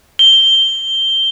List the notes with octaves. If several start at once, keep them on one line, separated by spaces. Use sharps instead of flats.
G7